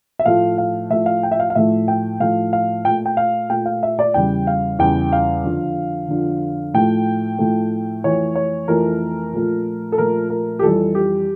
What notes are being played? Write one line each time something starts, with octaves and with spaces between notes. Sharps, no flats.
E5
A2 F3 A3 F5
F5
A2 F3 A3 E5
F5
G5
E5
F5
F5
A2 F3 A3 E5
G5
A2 F3 A3 F5
F5
A#2 A3 G5
G5
F5
A#2 A3 G5
F5
E5
D5
E2 C#3 G3 G5
F5
E2 C#3 G3 G5
F5
F2 D3 F3
F2 D3 F3
A2 F3 A3 G5
A2 F3 A3
F2 E3 A3 C#5
C#5
F2 E3 A3 A#4
A#2 F3 A3
A4
A#2 F3 A3 A#4
A#4
G4
F2 E3 G3 A4
G4